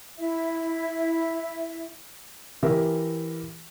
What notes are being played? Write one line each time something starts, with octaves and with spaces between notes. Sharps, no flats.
E4 E5
E3 G4 A#4 E5